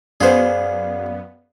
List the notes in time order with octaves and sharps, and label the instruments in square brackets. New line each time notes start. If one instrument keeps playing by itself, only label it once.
[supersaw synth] F#2 B3 [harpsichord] G#4 C5 [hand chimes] D5 F5